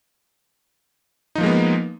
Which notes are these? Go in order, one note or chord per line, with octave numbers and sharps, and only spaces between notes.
F3 G#3 A#3 B3 D#4